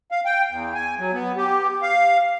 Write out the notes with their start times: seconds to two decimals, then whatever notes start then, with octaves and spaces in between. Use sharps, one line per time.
0.11 F5
0.25 G5
0.51 E2
0.75 G#5
0.99 F#3
1.13 B3
1.37 G4
1.83 F5